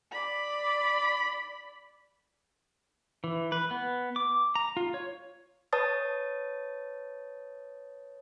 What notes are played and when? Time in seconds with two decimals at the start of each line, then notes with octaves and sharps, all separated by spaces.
0.11 D5 B5
3.24 E3
3.52 B4
3.71 B3
4.16 D6
4.55 A#5
4.77 F4
4.94 C#5
5.73 B4 C#5 A5 D#6 A6